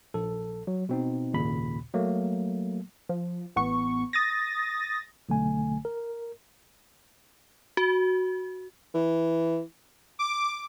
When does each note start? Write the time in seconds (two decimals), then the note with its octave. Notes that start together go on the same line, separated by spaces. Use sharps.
0.14 A#1 A4
0.67 F#3
0.89 B2 C4 D#4
1.33 G#1 D#2 A#2 C#3 B5
1.94 F#3 A3 A#3
3.09 F3
3.56 A1 B3 C#6
4.13 D#6 A6 A#6
5.29 B1 D3 A3 G#5
5.85 A#4
7.77 F#4
8.94 E3
10.19 D6